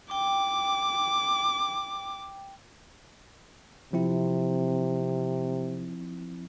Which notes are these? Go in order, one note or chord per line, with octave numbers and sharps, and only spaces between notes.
G5 D6
C3 F3 C4 E4